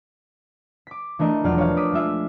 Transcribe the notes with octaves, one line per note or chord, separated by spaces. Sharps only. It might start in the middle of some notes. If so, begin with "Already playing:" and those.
D6 B6
E3 A3 D4 A#4 D#5
E1 F3 F#3 F4 D5 F6
C#5 F5
D6 D#6 B6
G#3 F4 E5